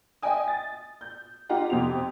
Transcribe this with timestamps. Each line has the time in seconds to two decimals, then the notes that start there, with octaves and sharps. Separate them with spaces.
0.22 D#5 E5 G5 G#5 D#6
0.48 A6
1.01 G6
1.49 D#4 F4 G4 F#5
1.70 F2 C3 C4 F7